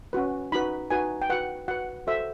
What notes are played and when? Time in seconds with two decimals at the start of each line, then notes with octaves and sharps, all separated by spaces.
0.13 C#4 F#4 B4
0.52 D#4 F#4 B4 B5
0.91 D#4 F#4 B4 G#5
1.22 G5
1.30 F#4 B4 F#5
1.68 F#4 B4 F#5
2.07 F#4 A4 C5 E5